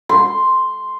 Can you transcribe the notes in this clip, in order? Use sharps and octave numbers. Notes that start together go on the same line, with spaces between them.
C6